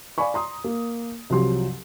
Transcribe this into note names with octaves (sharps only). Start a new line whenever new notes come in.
D5 F5 G#5 B5 C#6
A#5 C6 D#6
A#3
C2 F3 F#3 G4 C6